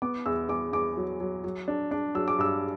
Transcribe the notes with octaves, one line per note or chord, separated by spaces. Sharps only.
B3 D6
E2 E6
E2 D6
E2 D6
F#3
F#3
F#3
D4
D4
F#3 E6
D6
G2 E6